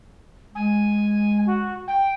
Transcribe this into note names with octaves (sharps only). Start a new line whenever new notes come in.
G#3 G#5
F#4
G5